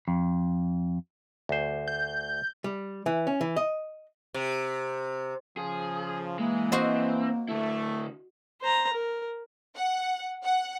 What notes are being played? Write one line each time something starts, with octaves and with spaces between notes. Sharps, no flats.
F2
D2 C5
G6
G3
E3
C#4
E3
D#5
C3
C#3 F3 G#4
E3 G#3 A#3
C4 F#4 C5 D#5
D3 A3 E4
C5 A#5
A#4
F#5
F#5